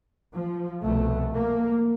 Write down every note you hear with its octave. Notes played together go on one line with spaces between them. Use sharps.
F3
C2 B2 A3
A#3